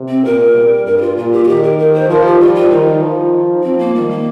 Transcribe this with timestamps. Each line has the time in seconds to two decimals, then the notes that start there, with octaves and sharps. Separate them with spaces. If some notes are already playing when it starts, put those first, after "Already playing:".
Already playing: C3
0.09 C4
0.25 A#2 A#4
0.55 G3
0.86 G2 A#4
0.98 G4
1.01 F4
1.17 A#2 F4
1.32 G4
1.44 F4
1.48 D#3 G4
1.63 A#4
1.79 A#4
1.94 C5
2.09 F3 A#4
2.25 G4
2.40 G3 F4
2.55 F4
2.71 D#3 D#4
3.02 F3
3.64 F3 C4
3.79 A#3
3.94 D#3 G3
4.10 A#3